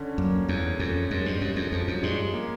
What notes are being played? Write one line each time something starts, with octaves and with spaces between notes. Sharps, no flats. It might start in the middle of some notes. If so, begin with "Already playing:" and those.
Already playing: D3 C#4
F#2 A#3
E2 A#3
F2 C#4
F#2 G#3
G2
F#2 G#3
F2
F2 F3
F#2
G2 G#3
A#3